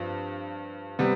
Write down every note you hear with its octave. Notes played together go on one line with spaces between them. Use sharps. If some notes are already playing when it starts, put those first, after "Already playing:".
Already playing: G2 F3 C4
C3 G3 B3